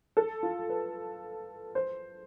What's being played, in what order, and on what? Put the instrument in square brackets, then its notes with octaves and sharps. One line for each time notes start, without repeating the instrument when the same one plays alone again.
[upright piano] A4
F4
B4
C5